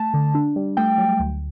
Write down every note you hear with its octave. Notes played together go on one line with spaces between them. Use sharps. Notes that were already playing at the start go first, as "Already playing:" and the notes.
Already playing: A3 A5
D3
D4
G3
A3 G5
F#3
D2